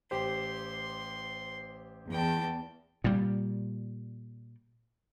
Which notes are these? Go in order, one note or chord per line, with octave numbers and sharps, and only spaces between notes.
A1 G4 C5 C6
E2 G5 A5
A#2 G3